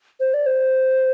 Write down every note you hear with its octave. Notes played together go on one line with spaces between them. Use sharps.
C5
D5
C5